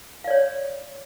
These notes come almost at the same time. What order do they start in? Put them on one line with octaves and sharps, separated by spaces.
F5 D5 C#5